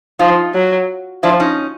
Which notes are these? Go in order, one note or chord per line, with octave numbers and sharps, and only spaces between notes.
F3 D#4 F4
F#3
F3 D4 E4
C#4 D#4